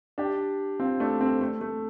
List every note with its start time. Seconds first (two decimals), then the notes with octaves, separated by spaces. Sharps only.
0.18 D4 G4
0.80 C4 F4
1.00 A3 D4
1.21 C4
1.41 A3
1.61 A3